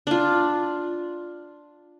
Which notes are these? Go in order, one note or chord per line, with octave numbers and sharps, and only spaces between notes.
D4 F4